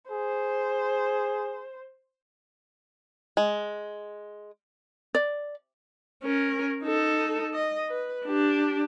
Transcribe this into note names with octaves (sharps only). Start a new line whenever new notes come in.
G#4 C5
G#3
D5
C#4 A#4
D#4 A4
D#5
B4
D4 G4